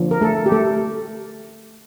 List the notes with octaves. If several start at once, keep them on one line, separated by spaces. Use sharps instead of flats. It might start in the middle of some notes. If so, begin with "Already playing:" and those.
Already playing: D3 F3 A#3
A#4
A3 A4
G4
A3 A4